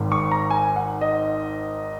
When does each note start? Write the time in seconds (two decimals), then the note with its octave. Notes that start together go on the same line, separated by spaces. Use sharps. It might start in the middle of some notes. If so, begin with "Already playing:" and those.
Already playing: G#1 G#2 D#3
0.12 C#6
0.31 A#5
0.50 G#5
0.76 F#5
1.01 D#5